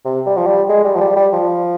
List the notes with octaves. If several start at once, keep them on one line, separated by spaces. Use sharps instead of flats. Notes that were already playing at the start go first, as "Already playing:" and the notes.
C3
G3
F3
G3
G#3
G3
F3
G3
G3
F3